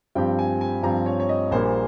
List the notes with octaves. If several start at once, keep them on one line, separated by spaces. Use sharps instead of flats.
G2 F3 C4 G4 G5
G#5
G#5
G2 F3 C4 G4 A#5
C#5
C#5
D#5
A#1 A#2 G3 A#3 C5